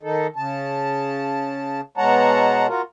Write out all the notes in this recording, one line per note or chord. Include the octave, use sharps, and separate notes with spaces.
D#3 D#4 A4
C#3 A5
B2 G#3 C#5 F#5 A5 A#5
F4 F#4 A#4